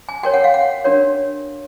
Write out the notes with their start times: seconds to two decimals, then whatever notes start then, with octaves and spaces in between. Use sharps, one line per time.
0.09 G#5
0.23 F#4 A#4 C#5 G5
0.34 F#5
0.44 F5
0.54 F#5
0.84 D4 F#4 A#4 C#5